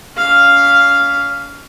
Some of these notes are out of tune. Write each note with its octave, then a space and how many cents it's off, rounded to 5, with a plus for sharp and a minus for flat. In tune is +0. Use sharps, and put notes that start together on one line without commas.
C#4 +35 F5 +0